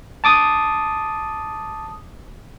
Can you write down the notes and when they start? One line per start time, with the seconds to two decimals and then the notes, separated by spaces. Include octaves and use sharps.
0.24 A5 D6 D#6